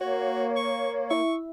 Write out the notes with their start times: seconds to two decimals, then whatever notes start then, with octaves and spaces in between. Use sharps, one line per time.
0.01 A#3 F#4 C#5
0.57 C#6
1.10 E4 E5 C#6